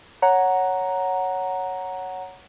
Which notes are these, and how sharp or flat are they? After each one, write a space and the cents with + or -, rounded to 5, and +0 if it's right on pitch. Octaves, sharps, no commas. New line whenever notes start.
C#5 +0 F#5 +0 A#5 +0